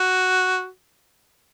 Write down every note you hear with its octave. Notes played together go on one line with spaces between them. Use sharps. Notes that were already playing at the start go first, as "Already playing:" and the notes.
Already playing: F#4